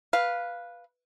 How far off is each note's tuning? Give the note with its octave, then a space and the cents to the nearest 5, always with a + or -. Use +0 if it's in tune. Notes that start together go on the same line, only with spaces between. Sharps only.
B4 -10 F5 +0